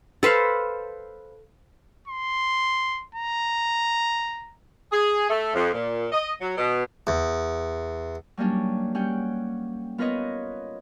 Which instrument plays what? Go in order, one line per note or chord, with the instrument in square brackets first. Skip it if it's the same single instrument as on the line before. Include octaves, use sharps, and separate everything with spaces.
[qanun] A4 B4 C5 F5
[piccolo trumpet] C6
A#5
[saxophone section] G#4
A3
F2
A#2
D#5
F#3
B2
[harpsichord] E2
[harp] F#3 G3 A#3 C#4 D4
G3 C#4 F#5 G5
B3 F4 A#4 B4 C#5 D#5